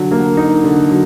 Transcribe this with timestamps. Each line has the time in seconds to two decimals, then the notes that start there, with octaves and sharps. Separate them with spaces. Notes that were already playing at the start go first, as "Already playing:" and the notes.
Already playing: D3 F#3
0.11 A#3
0.37 D#4
0.64 D3
0.90 F#3